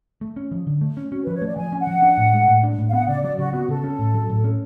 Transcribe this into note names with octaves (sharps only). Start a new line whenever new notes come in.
A3
C#4
F3
D3
A3
C#4
C#4 F#4
B4
F3
C#5
A3 D5
F3 G#5
C#4
F#5
F3
D4
A2
G#3
A2
D4
A2
F5
B3 F#5
C#3 D5
F#3 D5
C#3 F#4
B3 F#4
C#3 A4
C#4
A2
F#3
A2
C#4